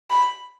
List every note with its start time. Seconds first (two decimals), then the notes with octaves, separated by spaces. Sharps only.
0.10 B5